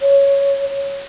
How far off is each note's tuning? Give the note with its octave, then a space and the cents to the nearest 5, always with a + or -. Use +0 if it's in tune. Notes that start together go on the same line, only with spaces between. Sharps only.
C#5 +5